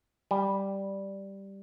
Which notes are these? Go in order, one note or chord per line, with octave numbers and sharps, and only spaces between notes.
G3